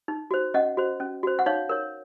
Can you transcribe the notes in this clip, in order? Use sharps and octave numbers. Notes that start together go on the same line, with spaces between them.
D#4
F#4 C5
C#4 D#5 F#5
F#4 C5
C#4
F#4 C5
F#5
D#4 C#5 F5
A#4 C#5